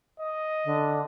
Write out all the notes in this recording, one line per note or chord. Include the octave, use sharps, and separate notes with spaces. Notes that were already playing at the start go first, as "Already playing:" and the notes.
D#5
D3